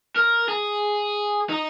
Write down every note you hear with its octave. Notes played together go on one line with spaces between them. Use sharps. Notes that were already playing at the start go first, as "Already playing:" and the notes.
A#4
G#4
D#4